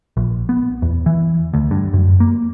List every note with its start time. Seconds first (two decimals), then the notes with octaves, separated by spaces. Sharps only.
0.17 A#1
0.49 B3
0.82 E2
1.06 E3
1.54 D2
1.71 G2
1.94 F#2
2.20 A#3